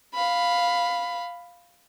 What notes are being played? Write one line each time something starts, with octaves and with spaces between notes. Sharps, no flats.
F5 B5